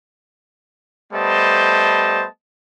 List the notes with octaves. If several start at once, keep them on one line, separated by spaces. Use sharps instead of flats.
G3 A3 B3 C5 D#5 A5